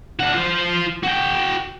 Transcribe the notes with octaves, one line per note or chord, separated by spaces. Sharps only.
D4 F#4
F4 C5
F#4 G5